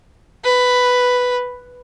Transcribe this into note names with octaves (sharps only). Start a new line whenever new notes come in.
B4